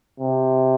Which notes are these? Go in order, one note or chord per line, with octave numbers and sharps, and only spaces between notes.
C3